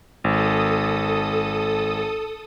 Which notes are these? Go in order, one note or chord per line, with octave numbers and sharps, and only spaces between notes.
G#1 A4 D#6